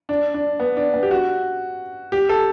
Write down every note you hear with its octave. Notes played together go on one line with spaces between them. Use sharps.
D4
D4
B3
D4
B3
G4
F#4
G4
A4